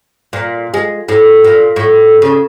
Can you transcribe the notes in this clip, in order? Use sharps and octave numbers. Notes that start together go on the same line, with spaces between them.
A#2
G#3
A2
A#2
A2
C#3